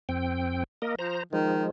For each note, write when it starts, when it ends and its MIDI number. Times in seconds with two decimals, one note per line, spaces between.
0.09 0.64 41
0.09 0.64 60
0.09 0.64 79
0.82 0.95 58
0.82 0.95 70
0.82 0.95 75
0.99 1.21 53
0.99 1.23 72
0.99 1.23 82
1.33 1.64 51
1.33 1.70 53
1.33 1.70 56